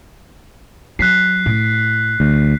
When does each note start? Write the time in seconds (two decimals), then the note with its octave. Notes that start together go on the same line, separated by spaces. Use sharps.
0.99 F#3 F#6 B6 C7
1.46 A2
2.20 D2